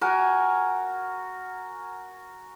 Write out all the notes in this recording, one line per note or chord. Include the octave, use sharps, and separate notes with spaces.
F#4 A#4 G#5